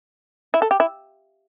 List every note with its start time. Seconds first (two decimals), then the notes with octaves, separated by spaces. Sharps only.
0.54 E4
0.62 A4
0.71 G4
0.80 E4